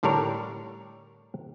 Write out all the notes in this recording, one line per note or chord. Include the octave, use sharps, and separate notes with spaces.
A2 D3 G3 D4 A#4 C#5